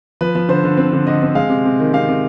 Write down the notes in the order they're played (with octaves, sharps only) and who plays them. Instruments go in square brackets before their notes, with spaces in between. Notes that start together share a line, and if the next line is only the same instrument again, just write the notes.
[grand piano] F3 B4
F3
D3 C5
D3
C4
D3
D3 D#5
C4
G#3 F5
C3
C3
D#3
C3 F5
C3